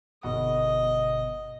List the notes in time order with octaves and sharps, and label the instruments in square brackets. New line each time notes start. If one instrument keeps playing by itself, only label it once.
[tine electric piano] G1 B2 F#5 [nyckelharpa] D#5